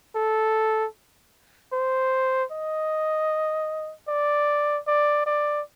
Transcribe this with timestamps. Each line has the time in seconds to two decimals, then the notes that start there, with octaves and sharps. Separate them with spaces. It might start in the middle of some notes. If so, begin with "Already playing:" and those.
0.16 A4
1.73 C5
2.51 D#5
4.08 D5
4.87 D5
5.26 D5